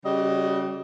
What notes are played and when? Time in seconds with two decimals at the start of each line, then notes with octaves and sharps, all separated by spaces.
0.05 C#3 G3 F#4 D#5